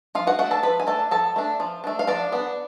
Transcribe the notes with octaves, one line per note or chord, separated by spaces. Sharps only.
F3 F4 F5
F#4 F#5
A3 D4 F#4 F#5
A4 A5
F3 B4 B5
G#5
A3 D4 A4 A5
F3 A4 A5
A3 D4
F3
A3 D4
F5
F3 D4 D5
B3 D4